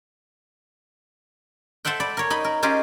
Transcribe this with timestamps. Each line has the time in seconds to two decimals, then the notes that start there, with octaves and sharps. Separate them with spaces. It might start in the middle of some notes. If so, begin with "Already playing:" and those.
1.85 A4 C5 E5 F#5 G5
2.00 D5 B5
2.17 A#4 C#5
2.30 D#4 D#5 B5
2.44 A#4
2.63 C#4 D#4 F4 G4 G#4